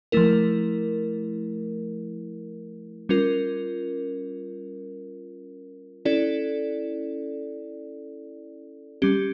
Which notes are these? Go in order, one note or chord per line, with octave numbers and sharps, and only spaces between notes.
F3 A3 E4 A#4
G3 C#4 F4 A#4
C#4 E4 A4 D5
G3 C#4 G4